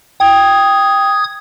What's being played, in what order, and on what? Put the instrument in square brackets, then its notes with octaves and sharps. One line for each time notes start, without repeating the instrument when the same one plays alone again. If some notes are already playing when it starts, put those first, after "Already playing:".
[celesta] G5 [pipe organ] D#6 G#6